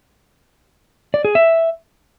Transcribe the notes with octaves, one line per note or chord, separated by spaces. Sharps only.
D5
G#4
E5